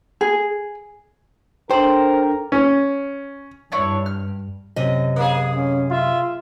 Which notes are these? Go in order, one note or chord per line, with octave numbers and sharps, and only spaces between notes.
G#4
D4 A4 A#4 C5 G5
C#4
G2 D4 E4 C#5
F6
F#2 C3 D#5
A#3 G#4
C#4
F4 E5